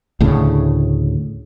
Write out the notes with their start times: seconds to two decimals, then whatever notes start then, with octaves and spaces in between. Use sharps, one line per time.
0.20 D2 A2 C#3